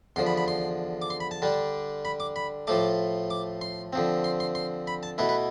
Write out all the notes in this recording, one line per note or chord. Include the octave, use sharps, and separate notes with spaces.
E2 D3 F3 C6
B5
B5
C6
D6
C6
B5
A5
D3 G3 D4
B5
D6
B5
A2 F3 A3 D6
D6
C6
D3 F3 C4
C6
C6
C6
B5
A5
B2 A3 E4 B4
B4